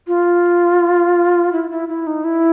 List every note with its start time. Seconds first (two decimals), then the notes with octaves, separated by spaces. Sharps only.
0.07 F4
1.53 E4
1.71 E4
1.88 E4
2.07 D#4
2.24 E4